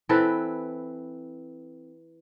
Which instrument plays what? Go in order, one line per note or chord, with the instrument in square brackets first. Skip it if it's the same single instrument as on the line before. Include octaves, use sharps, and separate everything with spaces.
[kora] E3 C4 A4 B4